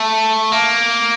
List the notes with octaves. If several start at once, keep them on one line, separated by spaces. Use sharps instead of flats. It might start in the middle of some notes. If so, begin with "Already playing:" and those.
Already playing: A3
A#3